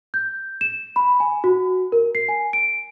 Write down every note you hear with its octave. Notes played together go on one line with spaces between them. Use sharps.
G6
E7
B5
G#5
F#4
A#4
C7
G#5
D7